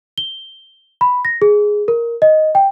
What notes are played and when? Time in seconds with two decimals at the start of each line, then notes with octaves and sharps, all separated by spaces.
0.18 G7
1.01 B5
1.25 A#6
1.42 G#4
1.88 A#4
2.22 D#5
2.55 G5